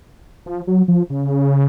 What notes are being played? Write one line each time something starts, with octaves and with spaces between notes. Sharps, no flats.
F3
F#3
F3
C#3